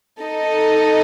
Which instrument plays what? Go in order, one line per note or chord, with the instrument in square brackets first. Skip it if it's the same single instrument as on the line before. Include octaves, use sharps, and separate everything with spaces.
[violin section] D#4 A4 D#5